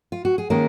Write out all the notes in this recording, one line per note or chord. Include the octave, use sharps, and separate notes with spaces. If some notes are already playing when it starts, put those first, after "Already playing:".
F4
F#4
G#4
D#3 G#3 A#3 C#4 A#4